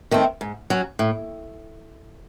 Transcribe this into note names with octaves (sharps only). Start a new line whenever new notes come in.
D#3 A3 C4
G#2
F#3 C#4
A2